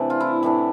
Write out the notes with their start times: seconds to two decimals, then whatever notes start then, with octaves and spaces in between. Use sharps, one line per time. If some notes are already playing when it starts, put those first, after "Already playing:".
Already playing: C3 E3 A3 D4
0.10 F4
0.20 E4
0.43 A2 E3 A3 D4